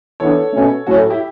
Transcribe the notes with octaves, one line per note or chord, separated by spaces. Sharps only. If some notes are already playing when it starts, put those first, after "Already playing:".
E3 B3 D4 A4 C#5
B2 A3 C#4
A2 F#3 A3 C#4 F#4 A4
E4 G4